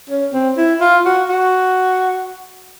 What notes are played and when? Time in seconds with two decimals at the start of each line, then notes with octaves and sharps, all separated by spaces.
0.10 C#4
0.33 C4
0.57 E4
0.81 F4
1.05 F#4
1.29 F#4